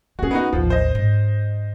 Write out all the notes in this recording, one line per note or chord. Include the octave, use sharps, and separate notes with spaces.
A#3 C#4 F#4 G#4
B3 D#4 F#4
A1 D#2 F3
C5 D#5
G#2